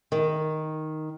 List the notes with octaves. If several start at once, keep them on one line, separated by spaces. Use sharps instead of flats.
D#3